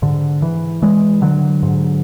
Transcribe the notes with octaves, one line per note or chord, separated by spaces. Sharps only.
G#2 D3
E3
E3 G#3
D3 F#3
G#2